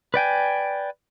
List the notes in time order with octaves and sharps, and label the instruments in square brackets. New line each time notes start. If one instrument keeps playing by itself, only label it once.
[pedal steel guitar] B4 D5 G5 G#5